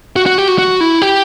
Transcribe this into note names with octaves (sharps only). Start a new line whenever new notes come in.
F#4
F#4
G4
F#4
F#4
E4
G4